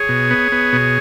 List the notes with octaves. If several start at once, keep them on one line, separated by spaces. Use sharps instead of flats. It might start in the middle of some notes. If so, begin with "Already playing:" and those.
Already playing: G#4 C#5
B2
B3
B3
B2